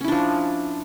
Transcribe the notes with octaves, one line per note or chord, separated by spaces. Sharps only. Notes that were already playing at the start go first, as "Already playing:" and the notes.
F3 C#4 D4 E4